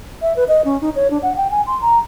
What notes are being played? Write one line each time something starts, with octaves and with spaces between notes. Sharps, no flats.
E5
B4
D#5
C#4
D#4
C#5
D4
F#5
G5
G#5
C6
A#5